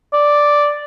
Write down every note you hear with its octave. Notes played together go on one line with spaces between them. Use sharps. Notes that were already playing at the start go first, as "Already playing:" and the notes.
D5